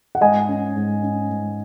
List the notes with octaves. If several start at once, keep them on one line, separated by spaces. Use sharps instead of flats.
F#5
G#2 D#5 G#5
C#4
G#2
C#4
G#2